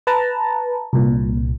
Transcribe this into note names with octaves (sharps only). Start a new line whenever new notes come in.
B4 A5 A#5
C2 A#2